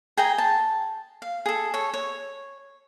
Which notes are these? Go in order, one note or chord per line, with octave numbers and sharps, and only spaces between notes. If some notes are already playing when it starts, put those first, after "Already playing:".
G#4 G5 G#5 A#5
A5
F5
G#4 A4
A4 C#5
C#5